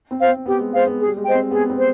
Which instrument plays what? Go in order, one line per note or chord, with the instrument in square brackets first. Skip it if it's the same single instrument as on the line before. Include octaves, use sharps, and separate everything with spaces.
[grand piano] C4
[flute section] C5 F5
[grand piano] C4
[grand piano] B3 [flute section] G4
[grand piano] G#3
[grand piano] G#3 [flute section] C5 F5
[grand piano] B3
[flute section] G#4
[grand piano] G3
G#3
[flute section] C5 D#5 G5
[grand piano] C4
[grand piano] B3 [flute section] G#4
[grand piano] C4
[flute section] C5